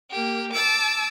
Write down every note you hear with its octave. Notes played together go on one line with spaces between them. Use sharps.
A#3 G4
A5 D6 E6